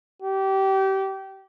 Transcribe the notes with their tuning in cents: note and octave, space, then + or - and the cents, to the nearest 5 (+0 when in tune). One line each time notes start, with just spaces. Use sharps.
G4 -25